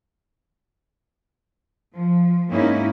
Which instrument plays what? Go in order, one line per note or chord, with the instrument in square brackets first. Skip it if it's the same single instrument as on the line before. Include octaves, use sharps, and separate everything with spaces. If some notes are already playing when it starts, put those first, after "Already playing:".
[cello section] F3
G#2 A#3 C#4 D#4 E4